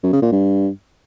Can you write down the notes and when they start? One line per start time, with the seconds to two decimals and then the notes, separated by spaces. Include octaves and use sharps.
0.03 F#2
0.13 C#3
0.22 A#2
0.32 G2